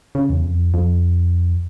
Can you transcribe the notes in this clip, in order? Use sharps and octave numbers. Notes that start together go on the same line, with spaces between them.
C#3
E2
F2
F2